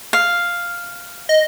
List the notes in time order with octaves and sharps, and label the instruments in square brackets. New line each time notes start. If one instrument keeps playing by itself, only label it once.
[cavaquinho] F5
[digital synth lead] D#5